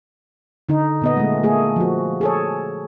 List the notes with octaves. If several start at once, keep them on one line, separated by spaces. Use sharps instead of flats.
D3 D#4
A#2 B3 D#5
G#3 A3
A3 A#3 G#4
F3 F#4
G#4 A4 C#5